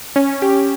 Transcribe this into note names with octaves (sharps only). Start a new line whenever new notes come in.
C#4
G4